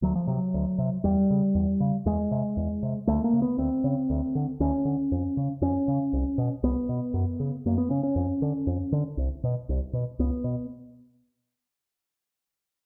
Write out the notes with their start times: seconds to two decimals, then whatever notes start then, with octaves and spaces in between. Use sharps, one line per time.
0.02 D2 F#3
0.16 F3
0.27 C3 F#3
0.54 D2
0.78 C3
1.04 E2 G3
1.31 C#3
1.55 E2
1.80 C#3
2.06 E2 G#3
2.31 C3
2.57 E2
2.83 C3
3.07 D2 A3
3.24 A#3
3.33 C#3
3.42 B3
3.58 D2 C4
3.84 C#3
4.10 D2
4.35 D3
4.60 D2 C#4
4.85 D3
5.12 F2
5.37 C#3
5.61 F2 C#4
5.88 C#3
6.13 C2
6.38 B2
6.63 C2 B3
6.89 B2
7.14 F#2
7.40 C#3
7.66 F#2 A#3
7.78 B3
7.90 C#3 C#4
8.03 C#4
8.16 F2
8.42 D3
8.67 F2
8.92 D3
9.17 C2
9.44 B2
9.69 C2
9.93 B2
10.19 C#2 B3
10.44 B2